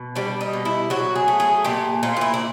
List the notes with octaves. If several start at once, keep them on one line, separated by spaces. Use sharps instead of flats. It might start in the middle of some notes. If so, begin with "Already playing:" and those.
Already playing: B2
G3 D4
D#4
B2
E4
F#3 F#4
G#4
A3
G#4
A#2 G4
A#2 F4
F4
E4
D4